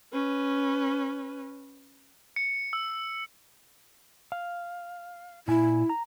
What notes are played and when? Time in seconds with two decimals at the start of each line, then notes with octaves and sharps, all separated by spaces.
0.12 C#4 B4
2.36 C#7
2.73 E6
4.32 F5
5.48 A#2 E4 G#5
5.89 A#5